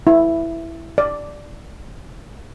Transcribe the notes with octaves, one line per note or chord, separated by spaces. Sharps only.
E4
D5